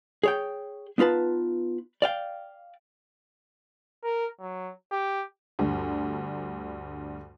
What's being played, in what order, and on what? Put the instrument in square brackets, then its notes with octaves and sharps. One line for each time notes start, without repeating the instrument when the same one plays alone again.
[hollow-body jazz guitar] G#4 C#5 G5
B3 D#4 F4 B4 A5
D5 F5 G5
[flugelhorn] A#4
F#3
G4
[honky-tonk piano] D2 G2